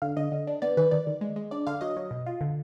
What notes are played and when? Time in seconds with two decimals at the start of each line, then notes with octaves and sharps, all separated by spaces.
0.02 D3 F5
0.17 D3 D#5
0.32 D3
0.47 D4
0.62 B3 D5
0.77 D#3 B4
0.91 D#3 D5
1.07 D#3
1.21 G#3
1.36 G#3
1.51 D4 D5
1.67 D3 F5
1.81 F#3 D#5
1.97 F#3
2.11 B2
2.26 F4
2.41 D3